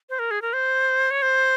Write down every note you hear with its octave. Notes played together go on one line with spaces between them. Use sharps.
C5
A#4
G#4
A#4
C5
C#5
C5